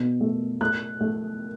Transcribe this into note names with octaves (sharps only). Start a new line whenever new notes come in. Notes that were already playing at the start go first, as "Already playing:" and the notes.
Already playing: B2
A3
A3 F#6
A3